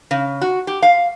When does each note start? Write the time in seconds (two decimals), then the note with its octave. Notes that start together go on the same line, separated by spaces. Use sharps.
0.11 C#3
0.41 F#4
0.67 G4
0.82 F5